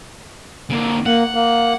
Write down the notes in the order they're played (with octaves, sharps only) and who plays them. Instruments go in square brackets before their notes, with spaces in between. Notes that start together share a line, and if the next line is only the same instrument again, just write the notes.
[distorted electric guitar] D3 A#3
[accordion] A#3 [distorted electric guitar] F#5
[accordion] A#3